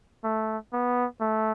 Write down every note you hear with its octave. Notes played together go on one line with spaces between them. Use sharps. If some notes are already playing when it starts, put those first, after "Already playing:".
A3
B3
A3